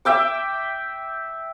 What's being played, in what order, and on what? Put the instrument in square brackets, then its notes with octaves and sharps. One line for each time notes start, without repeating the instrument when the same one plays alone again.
[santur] E5 G5 D6